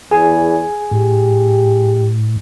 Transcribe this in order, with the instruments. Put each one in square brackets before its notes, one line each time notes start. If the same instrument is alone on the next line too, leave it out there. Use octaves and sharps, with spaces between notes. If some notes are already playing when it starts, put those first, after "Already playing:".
[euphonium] E2 [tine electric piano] G#4 G#5
[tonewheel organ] A2 [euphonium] G4